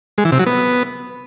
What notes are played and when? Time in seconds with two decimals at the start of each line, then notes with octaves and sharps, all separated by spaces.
0.18 G#3
0.25 E3
0.32 C3
0.39 F#3
0.47 B3